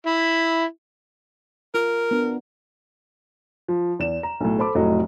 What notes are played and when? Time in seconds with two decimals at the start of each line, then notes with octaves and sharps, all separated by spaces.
0.07 E4
1.74 F4 A#4
2.11 B3 D4
3.68 F3
3.99 E2 E7
4.23 A#5
4.40 B1 A2
4.58 A4 C5 A5 B5 D6
4.75 F1 A2 F#3 D#5